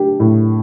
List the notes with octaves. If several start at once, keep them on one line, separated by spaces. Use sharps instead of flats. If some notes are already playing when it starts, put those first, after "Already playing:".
Already playing: D4 G4
A2